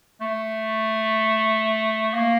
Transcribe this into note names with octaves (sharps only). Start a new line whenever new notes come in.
A3
A#3